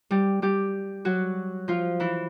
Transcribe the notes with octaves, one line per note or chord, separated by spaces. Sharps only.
G3 G4
G3 G4
F#3 F#4
F3 F4
E3 E4